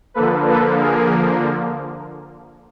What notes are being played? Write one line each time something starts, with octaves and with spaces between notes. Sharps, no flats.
D3 F3 A#3 A4 B4
A4 B4
G#4 A#4